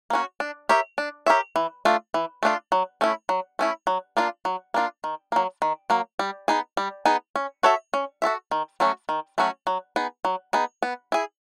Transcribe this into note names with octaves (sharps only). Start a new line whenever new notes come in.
A#3 C#4 F#4
D4
G4 A#4 C#5 E5
D4
G4 A#4 C#5 E5
E3
A3 D4 F4
E3
A3 D4 F4
F#3
A3 C#4 E4
F#3
A3 C#4 E4
F#3
A#3 D4 F4
F#3
A#3 D4 F4
D#3
F#3 A#3
D#3
F#3 A#3
G3
B3 D#4 G#4
G3
B3 D#4 G#4
C#4
F#4 A4 C#5 E5
C#4
F#4 A4 C#5 E5
D#3
F#3 A3 C#4 F#4
D#3
F#3 A3 C#4 F#4
F#3
B3 D#4 G#4
F#3
B3 D#4 G#4
B3
E4 G#4